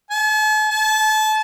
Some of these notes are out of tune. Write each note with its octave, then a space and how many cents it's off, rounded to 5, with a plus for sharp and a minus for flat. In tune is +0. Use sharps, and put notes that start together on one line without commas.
A5 -45
A5 -30